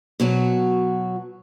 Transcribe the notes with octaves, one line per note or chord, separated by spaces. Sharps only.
B2 F#3 F#4